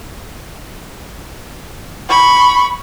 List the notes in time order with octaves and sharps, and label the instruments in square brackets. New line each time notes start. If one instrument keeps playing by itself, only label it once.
[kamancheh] B5 C#6